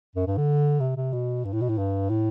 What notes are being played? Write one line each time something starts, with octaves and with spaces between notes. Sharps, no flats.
F#2
G2
D3
C3
C3
B2
G2
A2
B2
A2
G2
A2